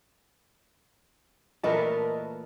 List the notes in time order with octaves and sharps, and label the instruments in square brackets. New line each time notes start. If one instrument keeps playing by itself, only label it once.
[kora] A#2 E3 A3 [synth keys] A#4 B4 A5 [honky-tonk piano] D#5